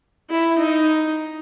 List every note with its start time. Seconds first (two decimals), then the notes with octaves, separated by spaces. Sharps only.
0.30 E4
0.58 D#4